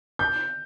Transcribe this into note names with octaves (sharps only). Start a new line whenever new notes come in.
G6